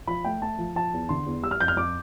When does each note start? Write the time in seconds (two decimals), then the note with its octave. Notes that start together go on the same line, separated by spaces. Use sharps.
0.07 F3 B5
0.25 A3 G5
0.42 A3 A5
0.58 F3
0.76 F3 A5
0.93 E2
1.09 D3 C6
1.26 E2
1.43 G3 E6
1.51 F6
1.60 F2 G6
1.68 F6
1.77 F2 D6